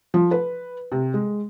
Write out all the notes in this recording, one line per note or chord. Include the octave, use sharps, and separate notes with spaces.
F3
B4
C3
G#3